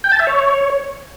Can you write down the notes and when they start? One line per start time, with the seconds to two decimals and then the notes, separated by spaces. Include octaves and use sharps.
0.04 G5
0.12 A5
0.19 E5
0.27 C#5